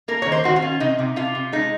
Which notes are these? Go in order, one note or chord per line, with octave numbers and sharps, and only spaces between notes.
A#3 A#4
D#3 C#5
C5
D#3 F#4
F4
C#4
C3 D#4
C3
C3 F4
C3
G#3 D#4